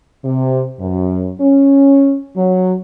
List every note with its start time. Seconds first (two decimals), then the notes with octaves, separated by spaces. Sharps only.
0.24 C3
0.80 F#2
1.41 C#4
2.36 F#3